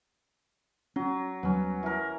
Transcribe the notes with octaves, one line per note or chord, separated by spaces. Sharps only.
F#3 C#4
D#2 F#3 G3 B3 C#4
E3 A#4